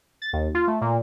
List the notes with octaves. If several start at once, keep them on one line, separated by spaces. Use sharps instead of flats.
A6
D#2
F4
A3
A#2